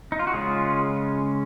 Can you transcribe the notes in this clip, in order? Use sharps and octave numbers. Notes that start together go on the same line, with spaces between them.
D#4
F4
F#4
C#3 G#3 C#4 F4 G#4